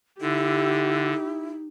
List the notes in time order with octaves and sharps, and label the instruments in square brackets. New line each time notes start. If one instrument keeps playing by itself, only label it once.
[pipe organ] D3 [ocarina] D#4 [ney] E4 [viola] G4